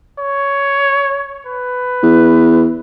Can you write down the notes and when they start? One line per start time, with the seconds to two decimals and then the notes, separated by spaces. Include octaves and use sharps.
0.19 C#5
1.46 B4
2.03 E2